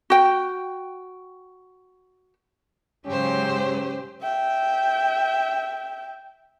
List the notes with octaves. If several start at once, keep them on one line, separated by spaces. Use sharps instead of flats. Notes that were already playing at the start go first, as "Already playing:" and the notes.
F#4 G5
G#2 C#3 F#3 C#4 G4 C5
E5 G5